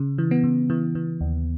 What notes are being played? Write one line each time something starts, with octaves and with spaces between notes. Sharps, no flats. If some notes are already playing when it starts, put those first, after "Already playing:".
Already playing: C#3
E3
B3
C#3
E3
E3
D#2